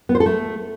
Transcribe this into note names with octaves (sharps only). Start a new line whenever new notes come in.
B3
C5
A4
A3